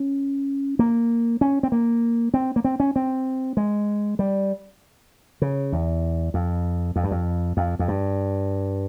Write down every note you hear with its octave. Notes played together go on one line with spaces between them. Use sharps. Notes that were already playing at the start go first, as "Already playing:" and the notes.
Already playing: C#4
A#3
C#4
C4
A#3
C4
A#3
C4
C#4
C4
G#3
G3
C#3
E2
F2
F2
G2
F2
F2
F2
G2